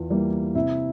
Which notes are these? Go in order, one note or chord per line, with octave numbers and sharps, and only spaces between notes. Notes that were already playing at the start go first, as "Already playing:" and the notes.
Already playing: E2 F4
E3 G3 A#3
C3 E4